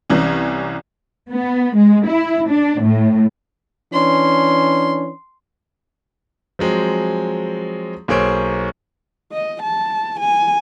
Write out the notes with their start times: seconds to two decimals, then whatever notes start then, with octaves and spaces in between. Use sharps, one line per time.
0.10 C2 E3 C#4
1.32 B3
1.76 G#3
2.08 E4
2.50 D4
2.81 A2
3.93 E3 C#4 D4 C6
6.59 F3 F#3 G#3 C4
8.08 B1 A#3 G#4 C5 C#5 D7
9.32 D#5
9.62 A5
10.19 G#5